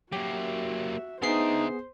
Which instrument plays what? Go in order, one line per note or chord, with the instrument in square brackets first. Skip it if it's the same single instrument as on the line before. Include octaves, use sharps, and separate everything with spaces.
[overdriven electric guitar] F#3 A#3 [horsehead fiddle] F#4 E5 [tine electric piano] G4
[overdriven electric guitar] D3 E5 [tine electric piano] B3 G#4 C7 [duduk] D#4 [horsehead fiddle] C5